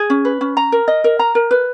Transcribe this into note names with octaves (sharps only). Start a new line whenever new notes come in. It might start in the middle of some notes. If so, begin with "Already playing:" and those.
Already playing: G#4
C#4
B4
C#4
A#5
A#4
D#5
A#4
A#5
A#4
B4